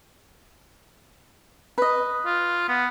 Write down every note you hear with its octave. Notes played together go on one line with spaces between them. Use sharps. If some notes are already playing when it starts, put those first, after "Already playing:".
B4 D#5
F4
B3